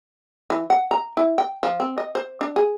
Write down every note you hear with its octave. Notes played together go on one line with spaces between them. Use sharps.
E3
F#5
A#5
E4
G5
F3
C4
D#5
C5
D4
G#4